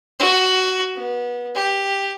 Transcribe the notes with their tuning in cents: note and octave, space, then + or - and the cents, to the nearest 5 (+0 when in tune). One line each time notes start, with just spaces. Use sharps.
F#4 +10
B3 -25
G4 +5